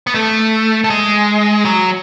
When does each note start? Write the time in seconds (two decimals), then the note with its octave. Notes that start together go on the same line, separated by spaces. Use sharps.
0.07 B3
0.15 A3
0.84 A3
0.90 G#3
1.65 F#3